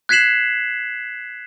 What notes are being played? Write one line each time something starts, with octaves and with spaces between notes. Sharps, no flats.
F#6 G#6 B6 C7 E7 F#7